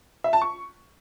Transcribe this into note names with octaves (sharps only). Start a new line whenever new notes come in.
E5
A5
C#6